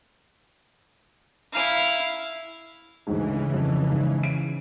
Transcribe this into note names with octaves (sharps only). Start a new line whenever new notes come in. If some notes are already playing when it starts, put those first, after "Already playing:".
E4 F5
D2 G#2 C#3 E3
F2
G#2
D7